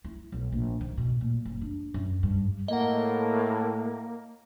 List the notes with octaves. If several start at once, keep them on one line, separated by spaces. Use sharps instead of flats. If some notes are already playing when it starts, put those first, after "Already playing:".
E4
B1
A#1
D#3
B2
A#2
F#1
D4
F#2
G2
A2 A#3 D#5 F#5